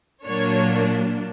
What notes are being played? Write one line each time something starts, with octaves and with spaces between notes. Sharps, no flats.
A#2 F#3 A#3 D4 C#5